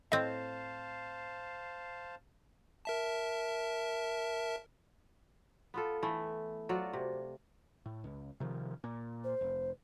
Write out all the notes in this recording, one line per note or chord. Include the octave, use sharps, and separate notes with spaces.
A2 C4 C5 D#5 F5 A5
A#4 E5 A5
B3 F4 A4
E3 A3
F#3 F4 F#4 D5
C3
A2
C#2
C3 D#3 F3
A#2
C5
F1